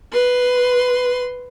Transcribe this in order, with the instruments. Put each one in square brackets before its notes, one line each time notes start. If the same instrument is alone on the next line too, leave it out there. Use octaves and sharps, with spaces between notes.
[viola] B4 C6